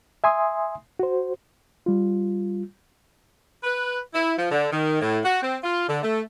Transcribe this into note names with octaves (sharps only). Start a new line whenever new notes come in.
E5 G#5 C6 D#6
F#4 C5
G3 F4
B4
E4
F3
D3
D#3
A2
F#4
C4
F4
D3
A3